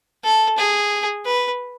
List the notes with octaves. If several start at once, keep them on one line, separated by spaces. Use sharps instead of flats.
A4
G#4
B4